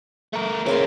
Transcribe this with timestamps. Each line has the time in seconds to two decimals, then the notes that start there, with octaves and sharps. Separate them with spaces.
0.33 A3 A#4
0.66 C#3 E3 C4 A#4 C6